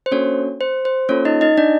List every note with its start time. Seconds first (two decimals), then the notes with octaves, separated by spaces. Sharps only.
0.06 C5
0.12 A#3 C#4 D4 F#4 A4 C#5
0.61 C5
0.85 C5
1.09 A#3 C#4 F4 A4 C#5
1.25 D#4 D#5
1.41 D#4 D#5
1.57 D4 D5